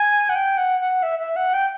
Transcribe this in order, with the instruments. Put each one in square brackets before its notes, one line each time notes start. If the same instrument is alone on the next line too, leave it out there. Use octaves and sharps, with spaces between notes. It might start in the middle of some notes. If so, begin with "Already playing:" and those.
Already playing: [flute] G#5
F#5
G5
F#5
F#5
E5
E5
F#5
G5